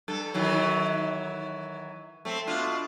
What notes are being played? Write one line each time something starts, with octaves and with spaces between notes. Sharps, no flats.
G2 A4
D#3 E3 F#3
A3 C4
B2 D4 F4